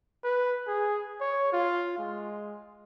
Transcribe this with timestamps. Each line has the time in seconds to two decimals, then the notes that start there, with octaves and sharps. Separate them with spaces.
0.24 B4
0.67 G#4
1.21 C#5
1.53 F4
1.98 G#3